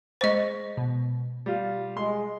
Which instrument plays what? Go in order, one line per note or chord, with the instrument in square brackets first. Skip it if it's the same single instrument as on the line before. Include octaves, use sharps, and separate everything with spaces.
[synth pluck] G#3 C#6 A#6 [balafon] C5 D#5
[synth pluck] B2
[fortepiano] G3 F4
[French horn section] G#3 [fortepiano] C6